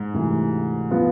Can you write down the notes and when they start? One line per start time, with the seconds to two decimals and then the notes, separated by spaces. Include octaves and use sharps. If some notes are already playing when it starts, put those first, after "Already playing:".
Already playing: G#2
0.14 D2 C3 E3
0.91 F3 B3 F4